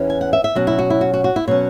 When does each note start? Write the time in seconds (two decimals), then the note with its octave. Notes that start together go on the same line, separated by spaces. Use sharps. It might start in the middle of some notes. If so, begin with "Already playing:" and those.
Already playing: E2 E3 C#4
0.10 G#5
0.21 F#5
0.33 E5
0.44 E5
0.55 B2 F#3 C#4 F#4
0.67 E4
0.78 F#4
0.90 E4
1.01 F#4
1.14 F#4
1.24 F#4
1.36 E4
1.48 B2 F#3 C#4 C#5